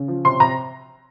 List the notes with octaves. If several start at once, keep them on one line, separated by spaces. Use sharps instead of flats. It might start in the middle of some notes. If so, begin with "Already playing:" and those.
Already playing: C#3
F3
C3 C6
C3 A#5